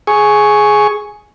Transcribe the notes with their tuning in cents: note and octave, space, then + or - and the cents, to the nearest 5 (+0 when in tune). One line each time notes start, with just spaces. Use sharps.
G#4 +10 C#6 +0